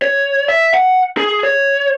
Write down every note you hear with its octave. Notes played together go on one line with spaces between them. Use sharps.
C#5
E5
F#5
G#4
C#5